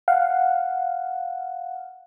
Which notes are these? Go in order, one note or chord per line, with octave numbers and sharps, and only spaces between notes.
F5 F#5